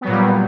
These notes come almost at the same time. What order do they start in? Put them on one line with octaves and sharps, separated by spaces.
B3 F#3 A#2 G3